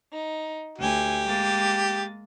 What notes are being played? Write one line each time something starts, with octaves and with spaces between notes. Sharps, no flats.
D#4
D2 G4 G#5
G#3 A#3 A6